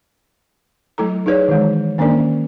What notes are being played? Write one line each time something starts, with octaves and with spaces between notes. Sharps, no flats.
F#3 A3 E4 A4 A#5
D#4 E4 G#4 B4 C#5 D5
D#3 E3 G#3
D#3 A#3 C#4 D4 A#4 D5